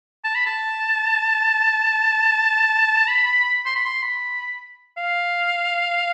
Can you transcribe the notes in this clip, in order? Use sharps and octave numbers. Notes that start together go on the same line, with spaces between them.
A5
B5
A5
B5
C6
B5
C6
B5
F5